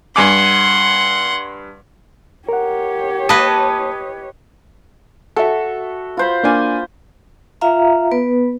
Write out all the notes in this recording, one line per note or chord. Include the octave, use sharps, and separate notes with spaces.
G2 F#5 G#5 C6 D6
G4 A#4 C#5 F#5
A#3 B4 D#5 A5 D#6
F#4 A4 E5
F4 C5 B5
A#3 D4 G#5
F4 E5 F5 A#5
B3 B4